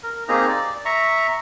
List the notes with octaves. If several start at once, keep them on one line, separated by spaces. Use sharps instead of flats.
A#4
A#3 C4 D#4 G4 G#4 A#5
D5
E5 A#5 C#6